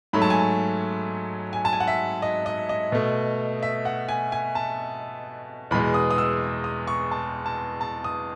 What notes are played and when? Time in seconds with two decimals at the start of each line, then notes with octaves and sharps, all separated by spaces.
0.13 G#2 F#3 A3 B5
0.22 A5
0.30 G#5
0.39 A5
1.53 G#5
1.65 A5
1.73 G#5
1.80 F#5
1.88 E5
2.22 D#5
2.46 D#5
2.69 D#5
2.92 B2 A3
3.63 E5
3.85 F#5
4.09 G#5
4.32 G#5
4.55 A5
5.71 E2 B2 G#3 B5
5.94 D#6
6.11 D#6
6.18 E6
6.64 D#6
6.87 C#6
7.11 A5
7.46 A5
7.81 A5
8.04 D#6